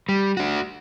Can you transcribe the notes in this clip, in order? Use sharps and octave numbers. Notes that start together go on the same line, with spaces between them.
G3
D4 F#4